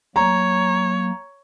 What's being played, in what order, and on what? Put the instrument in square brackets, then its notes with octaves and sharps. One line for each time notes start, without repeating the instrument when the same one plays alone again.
[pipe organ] F#3 A#3 [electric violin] C#5 [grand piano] A#5